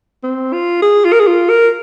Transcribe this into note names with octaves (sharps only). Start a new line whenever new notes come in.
C4
F4
G#4
F4
A#4
G#4
F4
A#4